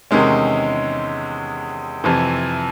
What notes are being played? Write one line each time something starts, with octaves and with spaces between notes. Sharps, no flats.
E2 C3 D#3 G#3 C#4
F2 C3 E3